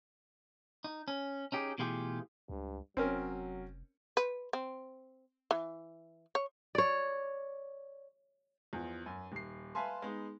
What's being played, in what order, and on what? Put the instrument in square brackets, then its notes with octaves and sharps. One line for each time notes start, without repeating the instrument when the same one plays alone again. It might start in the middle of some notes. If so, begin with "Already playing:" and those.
[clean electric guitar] D#4
C#4
C#4 D#4 G4 G#4
B2 E3 A3 F4 G4 G#4
[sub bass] C#2 [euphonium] G2
[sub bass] F1 [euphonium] F#3 [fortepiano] C4 C#4 A#4
[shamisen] B4
C4
E3
C#5
[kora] C#5 D5
[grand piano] E2 F3
F#2
D#1 C7
B4 E5 F5 G#5 A5 C6
G#3 B3 D#4